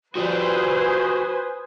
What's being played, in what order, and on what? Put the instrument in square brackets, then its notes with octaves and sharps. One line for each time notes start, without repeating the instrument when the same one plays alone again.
[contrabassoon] F3 [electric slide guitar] F#4 G4 D5 [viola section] B4 C5 G#5 [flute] D#6